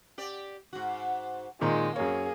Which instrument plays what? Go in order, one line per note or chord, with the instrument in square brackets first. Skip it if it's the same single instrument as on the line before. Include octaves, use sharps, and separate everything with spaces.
[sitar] G4 D5
G#2 F#4
[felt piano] A#2 D#3 D#4 [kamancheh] G#3 [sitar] C4
[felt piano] F#2 C#5 [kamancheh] A#3 G#4